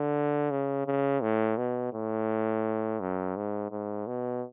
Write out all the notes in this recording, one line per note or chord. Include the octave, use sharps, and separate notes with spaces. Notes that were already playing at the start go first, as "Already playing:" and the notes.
Already playing: D3
C#3
C#3
A2
B2
A2
F#2
G#2
G#2
B2